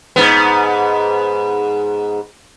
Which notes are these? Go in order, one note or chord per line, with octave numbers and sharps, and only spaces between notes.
G#2 B3